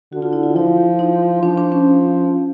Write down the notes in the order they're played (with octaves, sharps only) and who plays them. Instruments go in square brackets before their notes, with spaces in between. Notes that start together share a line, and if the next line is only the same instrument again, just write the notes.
[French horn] D3 [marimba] F#4
[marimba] F4
E4
F4
[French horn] F3 [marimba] E4
[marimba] D#4
[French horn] F3 [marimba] D4
[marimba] D4
C#4